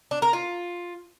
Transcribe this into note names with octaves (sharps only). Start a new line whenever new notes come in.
D4
A#4
F4